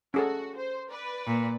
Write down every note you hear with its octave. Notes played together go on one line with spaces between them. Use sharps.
C#4 F#4 G#4 A4
C5
B4 D5
A#2